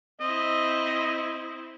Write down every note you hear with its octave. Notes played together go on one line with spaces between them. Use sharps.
C4 E4 D#5